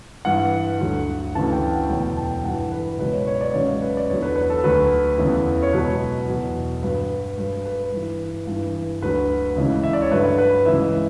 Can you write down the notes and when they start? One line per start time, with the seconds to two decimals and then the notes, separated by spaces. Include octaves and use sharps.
0.25 G2 E3 F#5
0.80 D2 D3 F#3
1.35 D2 C#3 E3 A5
1.53 G5
1.71 F#5
1.89 E2 B2 F#3 G5
2.03 G5
2.17 A5
2.31 G5
2.44 G2 E3 F#5
2.72 B4
2.99 C#2 B2 F#3 B4
3.13 C#5
3.21 B4
3.27 C#5
3.41 D5
3.53 C#2 C#3 F#3 C#5
3.82 B4
3.97 D5
4.09 E2 D3 F#3 C#5
4.22 B4
4.36 B4
4.50 A4
4.63 D2 D3 F#3 B4
5.18 E2 C#3 E3
5.63 C#5
5.73 C#2 B2 F#3 B4
6.28 E2 B2 F#3
6.83 G2 F#3 B4
7.38 G2 F#3 B4
7.65 B4
7.92 G2 E3
8.47 G2 E3
9.02 D2 D3 F#3 B4
9.56 C#2 C#3 E3
9.83 E5
9.93 D5
10.02 C#5
10.12 G2 D3 F#3 B4
10.38 B4
10.66 C#2 C#3 E3 E5